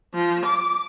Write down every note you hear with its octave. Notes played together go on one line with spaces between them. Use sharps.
F3
D6